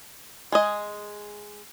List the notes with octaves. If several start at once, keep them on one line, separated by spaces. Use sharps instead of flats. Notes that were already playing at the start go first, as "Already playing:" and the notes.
G#3 G#4 D#5